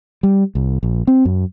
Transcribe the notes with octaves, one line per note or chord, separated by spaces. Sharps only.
G3
C2
A#1
C4
F#2